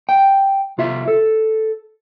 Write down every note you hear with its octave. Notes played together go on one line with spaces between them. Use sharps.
G5
C2 F4 E5
A4